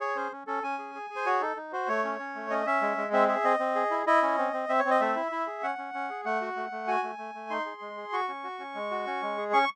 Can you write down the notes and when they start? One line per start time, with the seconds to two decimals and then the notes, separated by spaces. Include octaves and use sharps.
0.01 G#4 C#5
0.16 C#4 C5
0.32 C#4
0.47 C#4 A4
0.63 C#4 G#5
0.79 G#4
0.95 G#4
1.10 G#4
1.16 C5
1.26 F#4 C#5
1.41 D#4 A4
1.57 D#4
1.72 F#4 C5
1.88 A3 C#5
2.04 C#4
2.19 C#4
2.35 A3
2.50 C#4 D#5
2.66 C#4 E5
2.82 G#3
2.97 G#3
3.13 C4 E5
3.29 G#4 E5
3.44 C4 D#5
3.59 C4
3.75 G#4
3.91 E4
4.07 E4 D#5
4.22 C#4
4.38 C4
4.53 C4
4.69 C4 E5
4.79 C#5
4.85 C4
4.90 D#5
5.00 A3 E5
5.16 E4
5.32 E4
5.47 G#4
5.63 C#4 F#5
5.78 C#4
5.94 C#4
6.10 G#4
6.25 A3 F#5
6.41 F#4
6.56 A3
6.72 A3
6.88 F#4 G#5
7.03 A3
7.18 A3
7.35 A3
7.50 D#4 C6
7.66 G#4
7.81 G#3
7.97 G#4
8.12 F#4 C#6
8.28 C#4
8.44 F#4
8.59 C#4
8.75 G#3
8.91 F#4
9.07 C#4
9.22 G#3
9.37 G#4
9.53 C#4 C#6